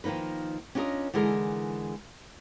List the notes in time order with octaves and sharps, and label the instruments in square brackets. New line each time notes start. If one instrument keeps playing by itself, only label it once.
[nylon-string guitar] D#3 F3 A#3 D#4 B4
C#4 D4 F4 A4 A#4 D#5
D3 E3 G#3 D#4 G#4 A#4